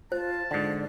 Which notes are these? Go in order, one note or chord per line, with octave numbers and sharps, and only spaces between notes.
F4 C5 A5
G#2 D3 D5